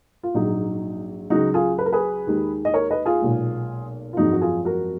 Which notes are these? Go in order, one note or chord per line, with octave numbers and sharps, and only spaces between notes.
F4
A#1 G#2 F#3 D#4
C#2 C#3 F#3 D#4 F#4
F4 G#4
B4
A#4
G#4 B4
D#2 D#3 G#3
D#5
A#4 C#5
B4 D#5
F4 G#4
B1 A#2 G#3
F4
G#1 F#2 F3 G#3 D#4 F#4
F#4
F4 G#4
F#4 A#4